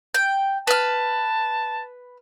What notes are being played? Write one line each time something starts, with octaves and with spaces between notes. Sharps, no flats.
G5
B4 A5 F6